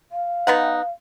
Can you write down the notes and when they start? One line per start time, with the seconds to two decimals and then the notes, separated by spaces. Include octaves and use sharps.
0.12 F5
0.47 B3 D#4 F#5